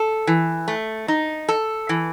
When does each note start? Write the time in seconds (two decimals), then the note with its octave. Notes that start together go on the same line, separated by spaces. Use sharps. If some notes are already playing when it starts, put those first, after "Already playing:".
Already playing: A4
0.27 E3
0.68 A3
1.08 D#4
1.49 A4
1.89 E3